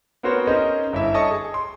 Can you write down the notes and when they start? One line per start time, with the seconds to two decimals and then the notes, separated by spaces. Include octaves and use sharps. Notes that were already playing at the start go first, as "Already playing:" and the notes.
0.23 B3 C4 F#4 A#4 C5 C#5
0.47 C#4 D#4 G#4 A#4 C5 D#5
0.93 G1 E4 E5
1.14 A4 C#5 D#5 A5 C#6 D#6
1.31 G#4
1.54 C6